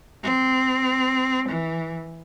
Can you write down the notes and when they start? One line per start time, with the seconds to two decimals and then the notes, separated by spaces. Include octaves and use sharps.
0.24 C4
1.49 E3